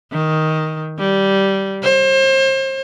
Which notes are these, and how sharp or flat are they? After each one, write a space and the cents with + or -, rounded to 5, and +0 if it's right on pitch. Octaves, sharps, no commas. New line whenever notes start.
D#3 +10
G3 -10
C5 +35